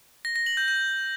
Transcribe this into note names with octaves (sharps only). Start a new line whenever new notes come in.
A#6
A#6
F#7
G6
G6